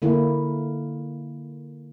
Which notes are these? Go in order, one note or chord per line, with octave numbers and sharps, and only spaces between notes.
D3 A#3 E4